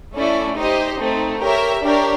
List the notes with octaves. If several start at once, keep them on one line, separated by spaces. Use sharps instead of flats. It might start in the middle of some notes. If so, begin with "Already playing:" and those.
A3 C#4 E4 A4 D5
D#4 G4 C5 D#5
A3 C4 D#4
G4 A#4 C#5 E5
D4 G4 A#4 C#5